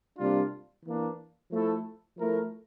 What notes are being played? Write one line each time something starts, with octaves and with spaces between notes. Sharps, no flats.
C3 G3 A#3 D4 F4
E3 A#3 D4
F3 A3 E4 A4
F3 A3 E4 A#4